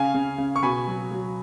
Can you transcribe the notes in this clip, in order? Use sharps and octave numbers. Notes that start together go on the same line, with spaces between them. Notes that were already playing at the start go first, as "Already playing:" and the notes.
Already playing: C#3 F5 G#5
C#3
C#3
C#6
B2 G#5 B5
F#3
F#3